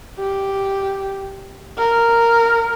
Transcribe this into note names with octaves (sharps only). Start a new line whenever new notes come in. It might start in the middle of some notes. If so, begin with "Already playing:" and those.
G4
A#4